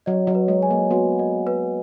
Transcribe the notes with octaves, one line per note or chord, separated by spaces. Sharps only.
F#3 D#5
F#3
B4
G#3
G#5
A#3
B3 F#4
D#5
B4